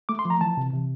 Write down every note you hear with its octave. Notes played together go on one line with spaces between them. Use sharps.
A3 D6
C6
F3
A#5
E3 A5
C3
C3